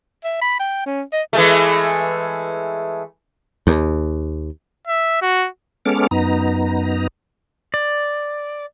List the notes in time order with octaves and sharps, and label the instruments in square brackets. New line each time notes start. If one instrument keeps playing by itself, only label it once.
[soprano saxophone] E5
B5
G5
C#4
D#5
[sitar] E3 G#3 A3
[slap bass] D#2
[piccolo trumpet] E5
F#4
[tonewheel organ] G#3 B3 C#4 A4 D6 F6
F#2 B3 D#4 A#5
[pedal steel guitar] D5